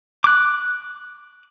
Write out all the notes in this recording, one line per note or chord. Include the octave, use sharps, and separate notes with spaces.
D6 F#6